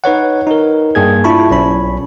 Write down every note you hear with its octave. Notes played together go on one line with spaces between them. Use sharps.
D#4 B4 C#5 F#5
D#4 A#4
G2 A#3 G#4 G#6
D4 E4 F4 A5 B5 C#6
B1 C#4 B5